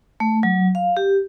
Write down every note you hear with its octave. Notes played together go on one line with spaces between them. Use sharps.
A3
F#3
F5
G4